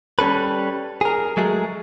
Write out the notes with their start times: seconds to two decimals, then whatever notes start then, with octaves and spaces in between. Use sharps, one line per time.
0.19 G3 C#4 A4 B4
1.01 G#4 A#4
1.37 F#3 G#3 A3 G#4